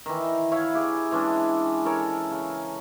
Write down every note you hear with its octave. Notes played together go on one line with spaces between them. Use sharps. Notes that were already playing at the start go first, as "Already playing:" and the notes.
D#3 E3
E4 C#5 F5 B5
E4 G4 G#4
E3 G#3 C#4 D4
A4 A#4 C#5
C#3